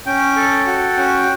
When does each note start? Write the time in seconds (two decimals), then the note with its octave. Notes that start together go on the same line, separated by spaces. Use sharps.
0.06 C#4 G5
0.36 A4
0.67 F#4
0.97 C#4